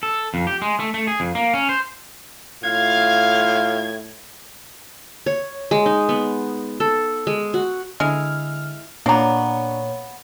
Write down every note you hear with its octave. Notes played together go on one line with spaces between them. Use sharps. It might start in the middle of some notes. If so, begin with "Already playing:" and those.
A4
F2
G4
G#3
A3
A3
G#4
F2
A#3
C#4
C5
A2 F4 F5 G#6
C#5
G#3
D#4
B3
A4
G#3
F#4
D3 G#3 E4 F6
A#2 A#3 B3 D4 C#5 A#5